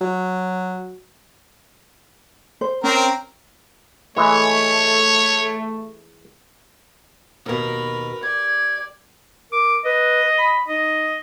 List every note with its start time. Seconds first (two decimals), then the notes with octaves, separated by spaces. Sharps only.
0.01 F#3
2.61 C5
2.84 C4 C#4 A#4
4.17 E3 G#3 A3 C#5
7.46 D#2 B2 A#4 B4
8.23 G4 D5 G#6
9.52 A#4 D6
9.85 B4 D#5
10.39 B5
10.68 D#4 D#5